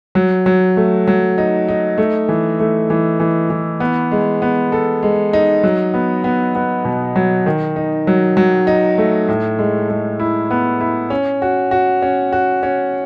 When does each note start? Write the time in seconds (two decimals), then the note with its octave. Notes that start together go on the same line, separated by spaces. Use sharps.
0.15 F#3
0.46 F#3
0.77 A3
1.07 F#3
1.38 D#4
1.68 D#4
1.98 A3
2.29 E3
2.60 A3
2.90 E3
3.20 E3
3.50 E3
3.80 B3
4.11 G#3
4.42 B3
4.72 A4
5.03 G#3
5.33 D#4
5.63 F#3
5.94 B3
6.24 B3
6.55 B3
6.85 B2
7.16 F#3
7.46 D#3
7.76 D#4
8.07 F#3
8.37 F#3
8.67 D#4
8.98 A3
9.28 A2
9.59 G#3
9.90 G#3
10.20 E4
10.51 B3
10.81 E4
11.10 C#4
11.42 F#4
11.71 F#4
12.02 C#4
12.33 F#4
12.63 C#4